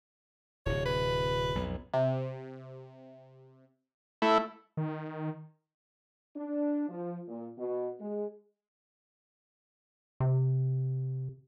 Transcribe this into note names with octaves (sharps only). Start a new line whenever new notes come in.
D1 C3 C#5
B4
B1 F2
C3
A3 E4
D#3
D4
F3
A#2
B2
G#3
C3